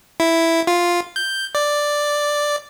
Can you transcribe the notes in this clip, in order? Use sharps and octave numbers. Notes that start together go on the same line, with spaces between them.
E4
F4
G6
D5